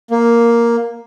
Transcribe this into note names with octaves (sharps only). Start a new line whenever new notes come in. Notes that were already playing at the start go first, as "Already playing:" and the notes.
A#3